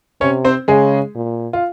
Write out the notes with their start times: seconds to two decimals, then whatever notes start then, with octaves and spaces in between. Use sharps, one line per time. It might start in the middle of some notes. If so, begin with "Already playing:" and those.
0.21 C3 C#4 C#5
0.45 C4 C5
0.68 C#3 G#3 G#4
1.15 A#2
1.53 F4